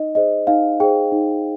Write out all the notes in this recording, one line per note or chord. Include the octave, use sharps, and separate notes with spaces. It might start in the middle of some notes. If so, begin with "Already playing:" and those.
Already playing: D#4 D#5
G#4 C5 D#5
D#4 F5
G#4 C5 G5
D#4